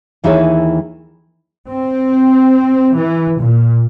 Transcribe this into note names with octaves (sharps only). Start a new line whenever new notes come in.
D#2 E3 D#4 E4 G#4 C#5
C4
E3
A#2